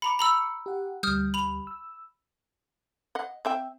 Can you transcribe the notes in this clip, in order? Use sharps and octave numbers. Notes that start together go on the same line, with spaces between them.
A#5 B5 D6 C#7
A#5 B5 E6
G4 F#5
D2 G3 D#6 F6 G6
B5 F7
E6
D#5 F#5
C4 E5 G5